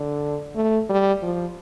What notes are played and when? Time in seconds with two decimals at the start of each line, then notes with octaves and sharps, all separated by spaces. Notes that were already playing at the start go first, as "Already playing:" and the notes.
Already playing: D3
0.55 A3
0.89 G3
1.22 F3